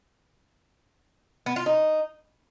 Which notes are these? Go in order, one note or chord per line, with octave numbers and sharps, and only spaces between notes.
B3
F4
D#4